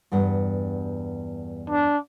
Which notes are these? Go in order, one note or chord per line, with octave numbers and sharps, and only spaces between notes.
E2 G2 F#5
D4